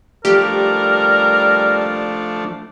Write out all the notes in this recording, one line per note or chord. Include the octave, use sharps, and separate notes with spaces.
F3 G3 A3 D4 G4 A#4